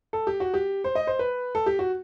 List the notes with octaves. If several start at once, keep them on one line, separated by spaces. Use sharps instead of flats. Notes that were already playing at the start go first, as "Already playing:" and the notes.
A4
G4
F#4
G4
C5
D#5
C5
B4
A4
G4
F#4